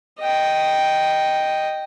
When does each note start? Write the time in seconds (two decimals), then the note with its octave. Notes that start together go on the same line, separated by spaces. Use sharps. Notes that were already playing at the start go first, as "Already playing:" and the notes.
0.20 D#5 G5